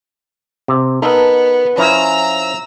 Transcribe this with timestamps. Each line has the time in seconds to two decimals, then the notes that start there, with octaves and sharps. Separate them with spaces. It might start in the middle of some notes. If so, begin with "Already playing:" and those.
0.68 C3
1.02 B3 D#4 A4 A#4
1.78 F3 C#4 E4 A#5 E6